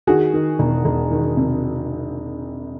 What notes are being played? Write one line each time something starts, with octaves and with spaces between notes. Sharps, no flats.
D#3 F#4 G#4
D#3
E1
E1
D#3
C3